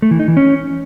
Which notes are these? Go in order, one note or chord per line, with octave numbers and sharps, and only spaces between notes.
A3
E3
D#4
E3
C#4